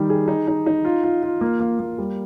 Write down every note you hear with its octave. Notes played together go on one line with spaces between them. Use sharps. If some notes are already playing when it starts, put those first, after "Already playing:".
Already playing: D#3 G3
G#4
D#4
D#4
D#4
F4
F4
F4
A#3
A#3
A#3
G3